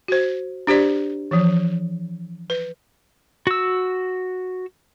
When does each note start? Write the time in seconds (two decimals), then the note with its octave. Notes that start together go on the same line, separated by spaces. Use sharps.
0.08 F#4 C5
0.67 D4 G4 C5 D5
1.31 E3 F3
2.50 B4
3.47 F#4 E6